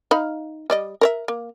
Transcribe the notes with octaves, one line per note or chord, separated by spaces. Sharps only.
D#4 F5 B5
G3 D5 D#5
A#4 C#5 E5
A#3